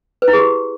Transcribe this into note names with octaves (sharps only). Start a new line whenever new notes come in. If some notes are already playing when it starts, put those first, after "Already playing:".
B4
E4
G#4
G4